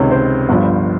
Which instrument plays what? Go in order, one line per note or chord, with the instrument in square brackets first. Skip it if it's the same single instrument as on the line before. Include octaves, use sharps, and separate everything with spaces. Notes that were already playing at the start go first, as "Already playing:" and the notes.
Already playing: [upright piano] C#2 C3 D#3 C#5
C5
G1 G2 F3